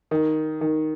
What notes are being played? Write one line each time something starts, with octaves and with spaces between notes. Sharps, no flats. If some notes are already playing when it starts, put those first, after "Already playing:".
D#3
D#3